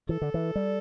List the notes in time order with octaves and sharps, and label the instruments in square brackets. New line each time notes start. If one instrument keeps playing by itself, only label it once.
[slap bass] E3 [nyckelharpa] A4
[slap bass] D3
E3
G3